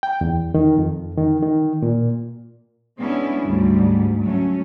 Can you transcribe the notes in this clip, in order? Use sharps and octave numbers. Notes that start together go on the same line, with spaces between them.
G5
E2
D#3
F2
D#3
D#3
A#2
G#3 B3 C#4 D4 E4
D2 G#2 G3
F#3 A3 C#4